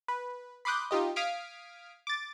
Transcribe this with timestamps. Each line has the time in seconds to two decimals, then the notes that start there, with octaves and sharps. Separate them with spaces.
0.08 B4
0.65 B5 C6 D6 D#6 F#6 G6
0.91 D#4 F4 G4 D#5
1.16 F5 D#6 F6 G#6 B6 D7
2.07 D6 A6